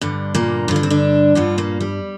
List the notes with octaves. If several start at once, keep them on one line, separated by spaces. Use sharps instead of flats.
G2 D3
A#2 A#3
G2 D3 F4
D4
C4
D3 D4
G2 D3 F3 F4
A#2 A#3
G3